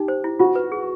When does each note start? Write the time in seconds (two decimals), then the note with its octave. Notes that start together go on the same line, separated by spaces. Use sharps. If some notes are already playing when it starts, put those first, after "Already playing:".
Already playing: D#4 G4
0.08 C5
0.24 E4
0.39 F4 F#4
0.55 B4
0.72 G#4